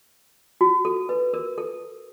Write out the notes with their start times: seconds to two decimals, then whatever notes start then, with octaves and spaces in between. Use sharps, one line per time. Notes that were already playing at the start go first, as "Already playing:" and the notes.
0.61 F#4
0.85 A4
1.09 B4
1.34 A#4
1.58 A4